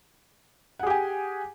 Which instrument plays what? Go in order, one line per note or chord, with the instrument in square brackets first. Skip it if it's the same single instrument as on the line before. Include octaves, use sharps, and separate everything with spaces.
[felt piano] F#5
G#4
G4
G#5